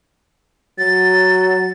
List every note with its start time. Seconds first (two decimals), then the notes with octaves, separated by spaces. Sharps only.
0.78 F#3 A6